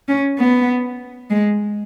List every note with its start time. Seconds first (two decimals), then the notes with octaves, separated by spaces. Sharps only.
0.08 C#4
0.39 B3
1.31 G#3